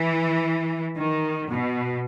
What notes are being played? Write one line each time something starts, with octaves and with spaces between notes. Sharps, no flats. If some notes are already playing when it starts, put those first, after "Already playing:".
Already playing: E3
D#3
B2